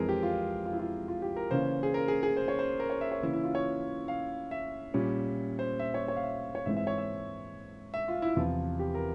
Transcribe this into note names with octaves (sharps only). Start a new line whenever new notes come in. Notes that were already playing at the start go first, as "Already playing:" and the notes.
Already playing: F2 E3 G#3 C4 G#4 A#4
G4
F4
F4
E4
F4
F4
G4
A#4
C#3 E3 A#3 C#4 C5
G#4
A#4
G#4
G#4
C5
C#5
C5
A#4
C#5
E5
C#5
C#3 E3 A#3 C#4 E4
E4
F4
C#5
F5
E5
A#2 G3 C#4
C5
E5
C#5
C#5
F5
E5
C#5
G#2 E3 G#3 C4 E5
E5
C#5
E5
E5
F4
E4
E2 C3 F3 F4
G4
A#4